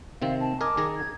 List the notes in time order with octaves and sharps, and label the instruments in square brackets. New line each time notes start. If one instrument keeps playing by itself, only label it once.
[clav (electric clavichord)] C3 D#3 C4 [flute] F5
[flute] A5
[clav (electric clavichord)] A#4 D#5 G#5 [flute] D6
[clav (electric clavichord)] D#3 G#4 A#5
[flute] G#6